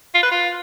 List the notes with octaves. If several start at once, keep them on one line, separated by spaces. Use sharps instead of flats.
F4
B4
F4